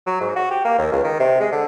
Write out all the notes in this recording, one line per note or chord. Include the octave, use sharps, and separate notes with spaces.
F#3
G#2
F#4
G4
A#3
D#2
C#2
D#3
C3
G#3
D3